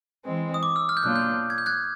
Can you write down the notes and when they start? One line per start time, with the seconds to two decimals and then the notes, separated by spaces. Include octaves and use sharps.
0.24 E3 G#3 C4
0.54 D#6
0.63 D6
0.76 E6
0.89 F6
0.97 G6
1.03 B2 F#3 A#3 D4 F4 F#6
1.16 G6
1.50 G#6
1.58 G6
1.66 F#6 G#6